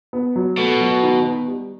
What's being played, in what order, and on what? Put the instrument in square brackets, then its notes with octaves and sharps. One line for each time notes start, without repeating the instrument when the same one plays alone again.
[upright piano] B3
F#3
[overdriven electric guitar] B2 [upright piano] A3
[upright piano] F#3
D#3
B3
G3